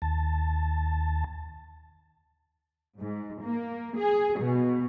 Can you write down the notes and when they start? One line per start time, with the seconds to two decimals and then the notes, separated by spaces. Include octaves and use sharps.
0.02 D#2 A5
3.00 G#2
3.44 A#3
3.97 G#4
4.39 B2